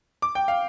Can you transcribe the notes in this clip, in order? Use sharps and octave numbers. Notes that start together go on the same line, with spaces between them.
D6
G5
F5